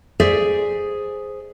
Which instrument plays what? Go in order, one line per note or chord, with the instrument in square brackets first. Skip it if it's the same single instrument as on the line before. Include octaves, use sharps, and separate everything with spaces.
[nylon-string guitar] G#4 C5 D5 E5